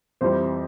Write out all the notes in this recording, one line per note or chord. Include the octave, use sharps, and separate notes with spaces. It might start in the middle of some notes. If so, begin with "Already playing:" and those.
F2 C3 E3 G3 C5